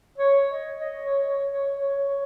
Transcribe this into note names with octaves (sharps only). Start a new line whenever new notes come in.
C#5
D#5
D#5
C#5
C#5
C#5
C#5